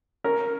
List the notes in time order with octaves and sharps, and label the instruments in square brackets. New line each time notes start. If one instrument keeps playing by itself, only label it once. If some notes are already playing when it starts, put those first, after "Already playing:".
[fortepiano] C#4 A#4